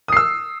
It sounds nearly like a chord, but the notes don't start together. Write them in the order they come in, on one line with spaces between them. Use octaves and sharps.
D#6 C7 E6